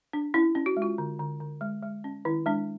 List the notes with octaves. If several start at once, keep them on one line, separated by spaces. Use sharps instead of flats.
D4
C#4 E4
C#4
F#4
G#3
F4
D3
D3
D3
G#3
G#3
C#4
D#3 E4
G#3 D4